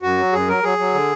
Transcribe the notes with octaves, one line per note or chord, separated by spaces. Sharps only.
F#2 F#4
F#3
F#2 G#4
F#3 A#4
F#3 G#4
F#3
D3